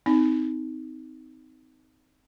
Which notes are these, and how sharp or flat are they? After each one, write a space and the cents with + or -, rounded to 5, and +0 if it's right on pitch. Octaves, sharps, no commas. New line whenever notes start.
C4 -20 D#4 +10